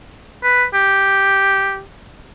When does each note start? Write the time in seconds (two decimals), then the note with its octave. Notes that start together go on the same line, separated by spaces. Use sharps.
0.43 B4
0.74 G4